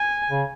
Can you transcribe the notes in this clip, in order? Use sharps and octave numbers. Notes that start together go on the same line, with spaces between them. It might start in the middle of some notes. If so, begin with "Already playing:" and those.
Already playing: G#5
C#3